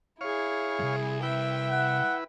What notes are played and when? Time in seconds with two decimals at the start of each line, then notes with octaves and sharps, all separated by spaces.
0.21 E4 G#4 C#5 F5
0.79 C2 F#2
1.23 E4 B4 E5 G5
1.71 F#5